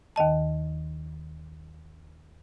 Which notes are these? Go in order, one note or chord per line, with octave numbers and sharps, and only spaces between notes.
D#2 D#3 D#5 A5